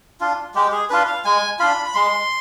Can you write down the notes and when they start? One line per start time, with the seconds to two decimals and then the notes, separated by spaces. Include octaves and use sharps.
0.20 D4 F4
0.55 G#3 G4
0.72 G#4
0.90 D4 F4 B4
1.07 F5
1.25 G#3 G#5
1.59 D4 F4 B5
1.86 B5
1.95 G#3 C6